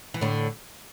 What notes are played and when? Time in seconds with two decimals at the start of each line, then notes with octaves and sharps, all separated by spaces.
0.14 E3
0.21 A2 D3